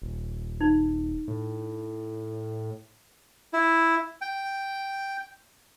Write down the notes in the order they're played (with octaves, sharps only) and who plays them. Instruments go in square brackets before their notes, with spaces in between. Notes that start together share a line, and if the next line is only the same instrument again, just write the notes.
[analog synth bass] D#1
[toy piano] D#4
[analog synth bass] A2
[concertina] E4
G5